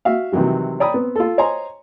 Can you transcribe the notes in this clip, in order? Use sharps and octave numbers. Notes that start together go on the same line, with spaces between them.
F#4 E5 F5
C3 D#3 E3 F#3 G3
C#5 D5 G5 A#5 B5 D#6
B3 C4
F4 A4
C5 C#5 D#5 G#5 A#5 C6